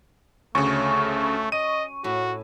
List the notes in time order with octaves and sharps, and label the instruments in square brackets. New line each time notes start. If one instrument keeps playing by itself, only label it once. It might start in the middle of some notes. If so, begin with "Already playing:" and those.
[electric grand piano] D2 C#3 [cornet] A3 [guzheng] C#4 F#4 [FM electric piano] C#6
[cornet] D#5 [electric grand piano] D#7
[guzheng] A2 [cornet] F#4